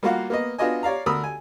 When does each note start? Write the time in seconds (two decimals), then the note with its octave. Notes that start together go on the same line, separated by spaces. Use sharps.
0.03 G3 A#3 F4 F#4 F5 F#5
0.30 A#3 B3 D#5
0.58 B3 D4 F4 F#4 D#5 G#5
0.83 C#5 D5 F5 A#5
1.06 D2 A#4 B5 D#6 E6
1.23 G#5